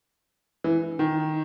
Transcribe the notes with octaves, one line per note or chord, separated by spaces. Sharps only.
E3
D#3